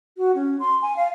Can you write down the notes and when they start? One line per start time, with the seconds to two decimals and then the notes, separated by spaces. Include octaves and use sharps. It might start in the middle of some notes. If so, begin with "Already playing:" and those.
0.17 F#4
0.35 C#4
0.60 C6
0.82 G#5
0.96 F5